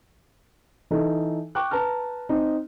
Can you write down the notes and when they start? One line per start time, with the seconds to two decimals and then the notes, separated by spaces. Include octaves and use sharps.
0.91 E3 D#4 A4
1.55 G5 C#6 D6 F#6
1.71 B4 A5 A#5 F6
2.29 C4 D#4